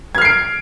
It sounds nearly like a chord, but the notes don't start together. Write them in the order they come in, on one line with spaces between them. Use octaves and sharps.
G#6 F6 C7 D7